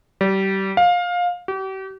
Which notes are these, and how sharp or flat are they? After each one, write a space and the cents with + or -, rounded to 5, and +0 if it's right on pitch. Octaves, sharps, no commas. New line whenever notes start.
G3 -25
F5 +20
G4 -40